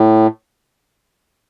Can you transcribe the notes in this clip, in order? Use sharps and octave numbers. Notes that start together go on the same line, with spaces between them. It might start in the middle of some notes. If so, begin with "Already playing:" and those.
Already playing: A2